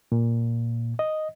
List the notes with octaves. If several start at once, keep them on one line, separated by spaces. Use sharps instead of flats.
A#2
D#5